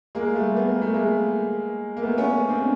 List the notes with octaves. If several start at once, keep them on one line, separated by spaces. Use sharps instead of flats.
G#3 A#3
G3 A3
B3
A#3
A3
G#3 A#3
A#3
A3 B3
B3 C#4
C4 D4